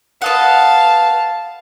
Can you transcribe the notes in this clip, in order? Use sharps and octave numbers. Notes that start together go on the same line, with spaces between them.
B4 D#5 F5 F#5 A5